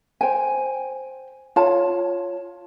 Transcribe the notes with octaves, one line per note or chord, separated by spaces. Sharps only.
C5 G5 G#5
F4 C#5 A5